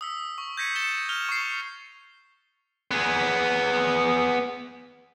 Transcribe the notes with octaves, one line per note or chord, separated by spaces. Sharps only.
D#6 E6 B6
C#6
G6 G#6 A#6 B6 C#7 D#7
A6 B6 C#7 E7 G7
F6 F7 G7
C#6 C7
B3 G#4